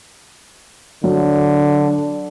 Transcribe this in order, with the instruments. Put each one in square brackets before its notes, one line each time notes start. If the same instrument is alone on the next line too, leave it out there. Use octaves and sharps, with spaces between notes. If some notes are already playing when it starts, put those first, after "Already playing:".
[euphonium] D3 [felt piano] F#3